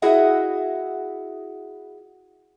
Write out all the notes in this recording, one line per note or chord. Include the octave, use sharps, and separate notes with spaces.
E4 F#4 G#4 D#5 E5 F#5